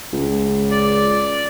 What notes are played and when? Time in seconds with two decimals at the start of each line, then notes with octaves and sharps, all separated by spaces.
0.13 C#2
0.71 D5